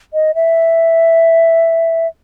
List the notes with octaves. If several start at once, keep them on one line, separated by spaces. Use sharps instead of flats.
D#5
E5